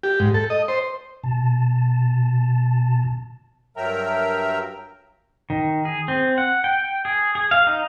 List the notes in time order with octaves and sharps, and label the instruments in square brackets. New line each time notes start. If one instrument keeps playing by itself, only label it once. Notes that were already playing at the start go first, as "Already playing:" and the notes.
[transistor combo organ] G4
G#2
A4
D#5
C5
[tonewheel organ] B2 A5
[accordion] G2 F#3 A#4 E5 G5 A#5
[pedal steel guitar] D#3
G#4
C4
F#5
G5
G#4
G#4
F5
D#4